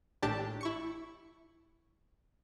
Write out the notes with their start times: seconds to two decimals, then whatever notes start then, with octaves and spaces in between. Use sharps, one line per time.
0.22 G#1 A2 D4 G4 A5
0.61 E4 C#6 C#7